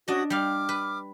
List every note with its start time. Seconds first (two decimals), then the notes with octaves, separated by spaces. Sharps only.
0.08 C#4 D4 F#4 D#5 D#6
0.30 G3 F5 D6 F6
0.69 B4